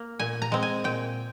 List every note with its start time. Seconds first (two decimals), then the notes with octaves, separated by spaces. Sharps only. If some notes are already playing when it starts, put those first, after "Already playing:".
Already playing: A#3
0.19 A#2 G#5
0.42 A#5
0.52 G#3 C4
0.63 G#5
0.84 A#2 G5